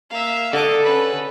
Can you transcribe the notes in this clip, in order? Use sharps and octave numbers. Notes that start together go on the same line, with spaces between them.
A#3 E5 F5
D3 A4 D#5 D6
C#4 B4